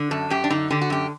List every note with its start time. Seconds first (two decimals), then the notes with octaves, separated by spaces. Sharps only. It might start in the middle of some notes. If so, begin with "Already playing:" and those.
Already playing: D3
0.11 F#2 A4
0.30 F#2 G4
0.44 D4
0.50 D3 D#4
0.71 D3 G4
0.81 F#4
0.90 F#2 G4